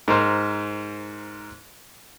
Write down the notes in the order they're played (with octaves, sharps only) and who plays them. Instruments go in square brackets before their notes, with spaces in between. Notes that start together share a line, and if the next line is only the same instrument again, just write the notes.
[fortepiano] G#2 A#4 C5 F6